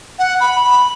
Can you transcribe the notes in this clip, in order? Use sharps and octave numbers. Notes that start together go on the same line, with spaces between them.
F#5
B5
B5